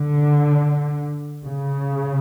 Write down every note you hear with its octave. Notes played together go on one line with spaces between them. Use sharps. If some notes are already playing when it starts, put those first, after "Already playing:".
Already playing: D3
C#3